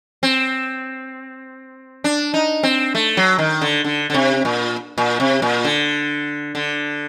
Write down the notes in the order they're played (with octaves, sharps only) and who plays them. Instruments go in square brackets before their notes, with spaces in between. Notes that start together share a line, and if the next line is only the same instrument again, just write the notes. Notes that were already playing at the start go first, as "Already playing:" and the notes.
[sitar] C4
D4
D#4
C4
A3
F#3
D#3
D3
D3
D3
C3
A#2
A#2
C3
A#2
D3
D3